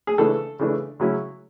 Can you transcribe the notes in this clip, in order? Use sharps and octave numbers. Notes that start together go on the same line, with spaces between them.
G#4
C#3 E3 A3 D4 A4
C#3 E3 A3 D4
C#3 F#3 C#4 E4